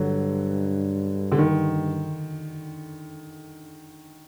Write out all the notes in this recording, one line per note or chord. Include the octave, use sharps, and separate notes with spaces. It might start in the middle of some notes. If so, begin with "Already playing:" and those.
Already playing: G2 D3 F#3
D3
D#3